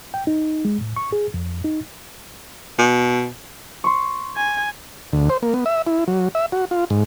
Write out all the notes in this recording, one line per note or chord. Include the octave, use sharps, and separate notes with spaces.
G5
D#4
G#3
A2
C#6
G#4
F2
D#4
B2
C6 C#6
G#5
D2
C5
A#3
B3
E5
E4
F#3
E5
F#4
F4
G#2